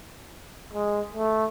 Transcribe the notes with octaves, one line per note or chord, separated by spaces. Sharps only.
G#3
A3